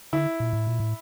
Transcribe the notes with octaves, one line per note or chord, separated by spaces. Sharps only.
D3 E4
A#2
A2
A#2
A2